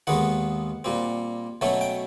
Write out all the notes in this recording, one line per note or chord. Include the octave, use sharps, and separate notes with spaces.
D#2 D#3 G#3 B3 F#5
A#2 G3 C4
B2 F#3 A3 C#4
G5